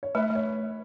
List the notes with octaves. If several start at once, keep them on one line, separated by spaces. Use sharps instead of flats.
C#5
A3 B4 E5
A3
C#5